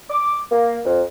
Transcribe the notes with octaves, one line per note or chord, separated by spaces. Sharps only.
D6
A#3
F2